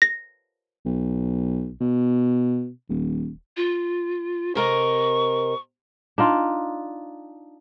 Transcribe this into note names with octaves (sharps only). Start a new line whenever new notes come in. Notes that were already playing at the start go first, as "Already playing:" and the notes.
A#6
B1
B2
D#1
F4
C3 A#4 D#5 C#6
D4 D#4 F4